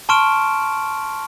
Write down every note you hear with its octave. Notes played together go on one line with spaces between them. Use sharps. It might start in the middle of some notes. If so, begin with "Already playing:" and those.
A5 C6 C#6 F6 D7 E7